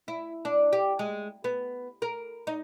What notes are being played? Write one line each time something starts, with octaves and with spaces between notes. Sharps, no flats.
E4
D4
G4
G#3
B3
A#4
D#4